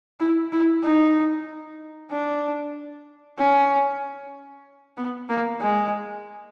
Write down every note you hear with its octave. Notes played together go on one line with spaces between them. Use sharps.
E4
E4
D#4
D4
C#4
B3
A#3
G#3